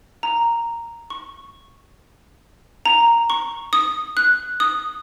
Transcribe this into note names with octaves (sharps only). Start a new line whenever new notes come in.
A#5
C#6
A#5
C#6
D#6
F#6
D#6